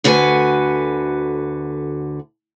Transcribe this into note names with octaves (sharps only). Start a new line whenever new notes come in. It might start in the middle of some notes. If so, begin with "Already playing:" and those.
D2 D3 F#4 B4 C5 G#5